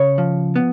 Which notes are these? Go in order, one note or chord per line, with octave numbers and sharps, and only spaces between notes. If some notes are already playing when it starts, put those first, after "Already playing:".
Already playing: C#3 C#5
F3
B3